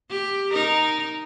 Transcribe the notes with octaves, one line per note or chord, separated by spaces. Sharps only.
G4
D#4 A#4